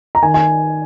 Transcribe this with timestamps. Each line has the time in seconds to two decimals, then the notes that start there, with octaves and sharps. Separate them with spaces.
0.15 A#5
0.22 D#3 G#5
0.34 G#5